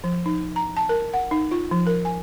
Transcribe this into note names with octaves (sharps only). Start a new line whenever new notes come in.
F3
D#4
A#5
A5
A#4
F#5
D#4
F4
F3
A#4
G#5